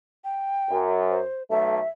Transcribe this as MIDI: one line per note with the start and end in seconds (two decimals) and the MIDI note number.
0.24 0.79 79
0.70 1.19 42
1.10 1.43 72
1.50 1.79 35
1.50 1.79 57
1.50 1.88 76